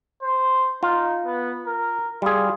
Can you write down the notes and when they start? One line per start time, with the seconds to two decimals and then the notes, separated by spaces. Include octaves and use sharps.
0.22 C5
0.83 D#4 F4
1.25 B3
1.66 A#4
2.22 G3 F4 G#4